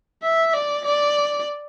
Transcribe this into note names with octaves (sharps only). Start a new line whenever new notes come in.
E5
D5
D5